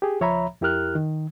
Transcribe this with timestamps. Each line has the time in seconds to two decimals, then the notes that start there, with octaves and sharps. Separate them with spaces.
0.02 G4 G#4
0.20 C#2 F3 C#5 E5 A#5 B5
0.61 F2 E4 G4 A#4 F6 F#6
0.95 D#3